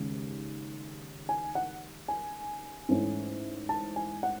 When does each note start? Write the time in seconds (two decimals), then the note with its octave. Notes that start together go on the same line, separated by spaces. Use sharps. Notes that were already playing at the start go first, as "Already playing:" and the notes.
Already playing: D#2 C#3 G#3 C#4
1.29 G#5
1.55 F#5
2.08 G#5
2.89 G#2 E3 A3 C#4
3.69 A5
3.96 G#5
4.23 F#5